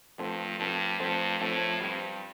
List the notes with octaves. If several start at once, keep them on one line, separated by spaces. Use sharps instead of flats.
G2 F3 A3 C4 A4 C5
G2 F3 A3 C4 A4 C5
G2 F3 A3 C4 A4 C5
A2 F3 A3 C4 A4 C5
G2 G3 C4 G4